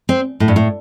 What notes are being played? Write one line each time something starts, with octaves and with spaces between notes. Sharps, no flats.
C4
A2
G2
A2